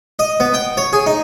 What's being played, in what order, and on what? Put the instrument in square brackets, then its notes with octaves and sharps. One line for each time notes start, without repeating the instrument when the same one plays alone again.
[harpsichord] D#5
B3
G5
C#5
G#4
D#4